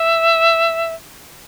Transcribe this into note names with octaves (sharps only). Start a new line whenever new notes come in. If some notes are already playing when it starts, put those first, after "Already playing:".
Already playing: E5